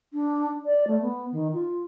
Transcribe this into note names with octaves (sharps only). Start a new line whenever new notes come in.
D4
D5
A3
B3
D#3
F4